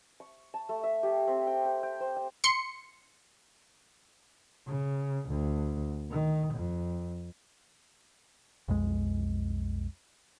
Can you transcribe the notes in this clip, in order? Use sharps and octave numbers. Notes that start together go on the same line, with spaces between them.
C#6
A5
A3
E5
G4
C4
G5
G5
G5
C5
G5
C6 C#7
C#3
D2
D#3
F2
B1 F2 G#3